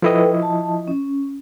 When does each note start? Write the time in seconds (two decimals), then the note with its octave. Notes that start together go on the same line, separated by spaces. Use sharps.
0.02 F3 E4 A4 B4 D#5 G5
0.42 A5
0.88 C#4